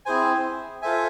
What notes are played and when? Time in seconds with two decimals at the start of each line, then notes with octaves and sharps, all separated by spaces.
0.06 C4 E4 G#4 C5 G#5
0.82 F4 A4 C5 E5 G#5